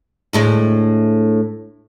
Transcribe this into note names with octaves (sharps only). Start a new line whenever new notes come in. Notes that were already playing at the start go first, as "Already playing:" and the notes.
D2 A2 G#3